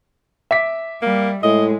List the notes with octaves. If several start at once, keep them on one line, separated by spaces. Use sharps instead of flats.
E5 D6 B6
G3 A#3
A2 G#3 D#5